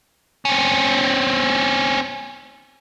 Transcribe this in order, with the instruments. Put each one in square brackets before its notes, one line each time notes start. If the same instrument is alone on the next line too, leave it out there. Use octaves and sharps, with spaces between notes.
[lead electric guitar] C4 C#4